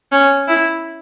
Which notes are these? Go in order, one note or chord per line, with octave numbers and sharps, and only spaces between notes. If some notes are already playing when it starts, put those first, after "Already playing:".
C#4
E4